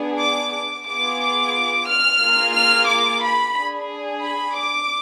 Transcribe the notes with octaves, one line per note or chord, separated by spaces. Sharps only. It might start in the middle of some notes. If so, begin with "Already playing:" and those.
Already playing: B3 D4 G#4
D6
D6
B3 F4 G#4 D6
D6
F6
A#3 F4 G#4
F6
D6
B5
D4 G#4
B5
D6